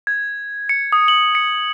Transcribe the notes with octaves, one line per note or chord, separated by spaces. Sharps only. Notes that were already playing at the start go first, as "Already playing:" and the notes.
G#6
C#7
D#6
F#7
C#7